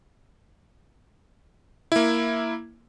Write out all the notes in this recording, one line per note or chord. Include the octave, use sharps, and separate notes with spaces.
A#3 E4